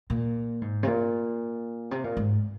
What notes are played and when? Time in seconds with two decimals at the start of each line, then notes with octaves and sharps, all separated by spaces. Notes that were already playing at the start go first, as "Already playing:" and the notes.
0.10 A#2
0.62 G#2
0.83 C3
0.87 A#2
1.91 C3
2.04 A#2
2.17 G#2